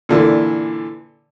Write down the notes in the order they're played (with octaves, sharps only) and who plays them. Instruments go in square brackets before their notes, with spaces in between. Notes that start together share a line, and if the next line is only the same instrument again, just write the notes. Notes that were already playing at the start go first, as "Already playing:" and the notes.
[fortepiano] A#2 D3 E3